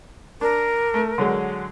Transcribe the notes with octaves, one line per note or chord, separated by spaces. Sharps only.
D4 A#4
A3
D3 F#3 G#3